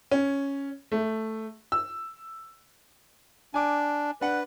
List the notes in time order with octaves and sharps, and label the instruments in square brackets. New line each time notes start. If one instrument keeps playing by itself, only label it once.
[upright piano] C#4
A3
E6
[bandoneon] D4 [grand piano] G#5 D6
[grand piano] D4 F#5 [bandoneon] B4